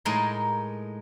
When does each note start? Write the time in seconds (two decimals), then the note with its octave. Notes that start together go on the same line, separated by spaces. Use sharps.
0.05 A2 G#3 D#4 A#4 C6